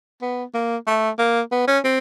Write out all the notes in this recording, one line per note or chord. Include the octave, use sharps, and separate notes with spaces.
B3
A#3
A3
A#3
B3
C#4
C4